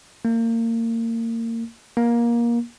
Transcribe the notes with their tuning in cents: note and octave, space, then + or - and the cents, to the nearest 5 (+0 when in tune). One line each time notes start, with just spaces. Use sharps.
A#3 -30
A#3 +20